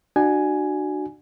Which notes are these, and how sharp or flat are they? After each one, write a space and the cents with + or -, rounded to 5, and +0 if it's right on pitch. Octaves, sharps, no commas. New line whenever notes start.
D4 +35 F#4 +5 G#5 +5